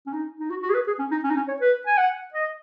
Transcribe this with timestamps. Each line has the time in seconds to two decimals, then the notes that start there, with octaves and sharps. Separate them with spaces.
0.06 C#4
0.13 D#4
0.39 D#4
0.50 F#4
0.62 F#4
0.70 G#4
0.74 B4
0.87 G#4
0.99 C#4
1.11 D#4
1.24 C#4
1.30 D#4
1.36 C#4
1.48 C#5
1.61 B4
1.87 G#5
1.97 F#5
2.34 D#5